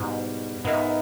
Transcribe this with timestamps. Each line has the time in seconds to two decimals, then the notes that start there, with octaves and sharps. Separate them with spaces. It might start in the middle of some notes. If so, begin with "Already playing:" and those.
Already playing: G#2 B2 G3 B3 E4
0.64 G#2 B3 D#4 A#4 E5